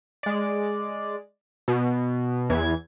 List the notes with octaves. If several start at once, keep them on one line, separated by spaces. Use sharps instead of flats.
G#3 D5
B2
E2 E3 G#6